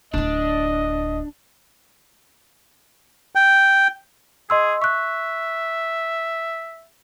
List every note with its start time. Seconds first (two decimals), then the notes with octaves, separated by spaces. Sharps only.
0.14 D1 D4 E4 D#5
3.35 G5
4.50 G#4 D#5 C6 E6
4.82 E5 C#6 F#6